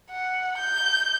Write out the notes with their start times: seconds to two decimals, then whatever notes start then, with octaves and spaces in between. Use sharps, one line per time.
0.10 F#5
0.57 G6